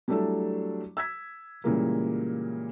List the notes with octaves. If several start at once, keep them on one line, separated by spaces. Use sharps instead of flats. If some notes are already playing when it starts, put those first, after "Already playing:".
F#3 G3 A3 D4 E4 A4
E6 G#6 B6
A#2 C#3 E3 G3 G#3 A#3